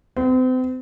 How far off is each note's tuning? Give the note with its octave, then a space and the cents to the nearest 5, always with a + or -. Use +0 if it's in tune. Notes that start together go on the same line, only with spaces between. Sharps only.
C4 -40